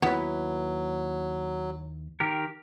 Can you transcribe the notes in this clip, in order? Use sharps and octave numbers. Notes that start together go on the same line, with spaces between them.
D#2 F#3 B3 E4 B4
D#3 G4 A#4